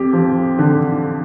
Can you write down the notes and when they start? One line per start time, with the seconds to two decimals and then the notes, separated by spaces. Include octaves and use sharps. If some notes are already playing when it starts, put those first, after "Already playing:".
Already playing: F2 G4
0.13 F3
0.59 D3